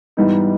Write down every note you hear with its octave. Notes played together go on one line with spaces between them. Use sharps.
G#2 E3 G3 B3 D#4